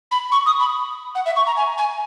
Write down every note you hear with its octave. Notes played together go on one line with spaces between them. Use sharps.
B5
C#6
D#6
B5
F#5
E5
C#6
A#5
G#5
G#5